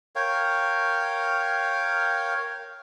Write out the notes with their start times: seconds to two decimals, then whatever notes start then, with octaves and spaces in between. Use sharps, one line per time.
0.15 A#4 C#5 F5 G5